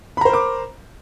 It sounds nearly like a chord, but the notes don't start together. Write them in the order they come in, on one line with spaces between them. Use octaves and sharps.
B5 A#5 C5 A#4 D6